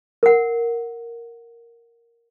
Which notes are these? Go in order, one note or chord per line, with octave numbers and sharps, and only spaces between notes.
A#4 F#5